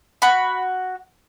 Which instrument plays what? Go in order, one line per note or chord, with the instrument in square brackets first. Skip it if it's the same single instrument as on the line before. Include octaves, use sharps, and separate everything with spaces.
[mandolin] F#4 B5